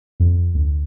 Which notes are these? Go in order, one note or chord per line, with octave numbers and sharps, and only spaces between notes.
F2
D2